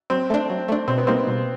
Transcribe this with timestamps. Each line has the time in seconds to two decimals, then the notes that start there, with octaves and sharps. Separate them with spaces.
0.10 F#3 C4
0.30 A3 D4
0.50 F#3
0.68 A3 D4
0.88 B2 C4
0.98 B3
1.07 G3 A#3 C4 D#4
1.27 B2